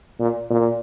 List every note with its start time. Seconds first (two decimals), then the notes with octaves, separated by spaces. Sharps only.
0.19 A#2
0.50 A#2